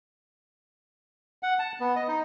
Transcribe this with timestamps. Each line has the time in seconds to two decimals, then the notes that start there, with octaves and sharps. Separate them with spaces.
1.43 F#5
1.59 A5
1.80 B3
1.96 D#5
2.08 D#4